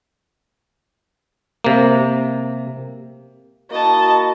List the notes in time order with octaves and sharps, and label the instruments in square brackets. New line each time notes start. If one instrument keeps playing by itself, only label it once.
[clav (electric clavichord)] C3 A#3
[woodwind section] A#3 E4 F#4 [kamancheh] D#5 A5